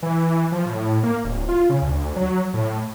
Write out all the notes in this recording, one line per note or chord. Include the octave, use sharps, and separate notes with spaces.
E3
F3
A2
A#3
D1
F4
C#3
D2
F#3
A2